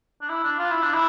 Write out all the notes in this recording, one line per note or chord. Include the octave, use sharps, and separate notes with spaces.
D4
E4
D4
F4
E4
D4
E4